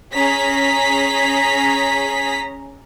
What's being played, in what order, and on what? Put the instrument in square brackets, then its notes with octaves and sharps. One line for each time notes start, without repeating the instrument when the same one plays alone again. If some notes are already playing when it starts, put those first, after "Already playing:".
[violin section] C#4 G#4 A#5 B6